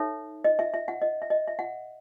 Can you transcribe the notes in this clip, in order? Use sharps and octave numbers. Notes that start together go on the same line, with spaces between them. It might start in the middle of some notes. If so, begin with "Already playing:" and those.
Already playing: D#4 A4 C#5 E5
D#5
E5
E5
F#5
D#5
E5
D#5
E5
F#5